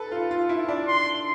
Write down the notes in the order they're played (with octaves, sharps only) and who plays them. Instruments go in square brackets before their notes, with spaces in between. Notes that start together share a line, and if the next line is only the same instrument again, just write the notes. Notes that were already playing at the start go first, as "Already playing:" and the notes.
Already playing: [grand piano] A4 B4
F4
F4
E4
D4
[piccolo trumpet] C6